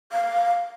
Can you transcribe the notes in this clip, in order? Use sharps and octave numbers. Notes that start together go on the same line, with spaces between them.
F5